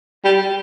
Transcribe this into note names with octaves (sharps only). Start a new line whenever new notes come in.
G3